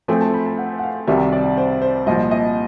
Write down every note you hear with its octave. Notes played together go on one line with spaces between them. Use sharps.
F3 A3 C4 G#5
A5
B5
A5
F#5
F#5
F5
C2 C3 D#3 G3 E5
D5
C5
C5
C2 A#2 F3 D#5
D#5